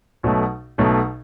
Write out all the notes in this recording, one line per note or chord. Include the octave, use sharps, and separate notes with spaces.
B1 B2 F#3 A3
B1 B2 F#3 A3